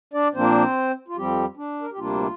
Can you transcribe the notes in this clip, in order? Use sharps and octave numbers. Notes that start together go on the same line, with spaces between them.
D4 D5
A#2 F3 A#3 C4 D4 C5
F4
F2 F3 G3 C4 G4
D4
A#4
G4
D2 C3 G3 A#3 D4 F4